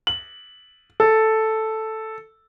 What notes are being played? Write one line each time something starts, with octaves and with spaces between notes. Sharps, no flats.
F#7
A4